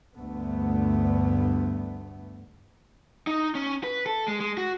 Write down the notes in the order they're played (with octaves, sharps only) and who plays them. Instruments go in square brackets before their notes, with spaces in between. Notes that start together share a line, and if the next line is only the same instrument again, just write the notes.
[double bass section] D2 G2 A3 B3
[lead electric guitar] D#4
C#4
B4
A4
G#3
G#3
F#4